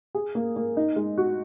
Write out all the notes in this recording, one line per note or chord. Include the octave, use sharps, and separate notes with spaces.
G#4
A#3
A#3
D#4
G#3
F#4